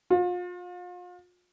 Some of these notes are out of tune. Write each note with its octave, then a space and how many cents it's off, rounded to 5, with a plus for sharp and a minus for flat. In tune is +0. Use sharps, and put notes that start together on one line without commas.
F4 +35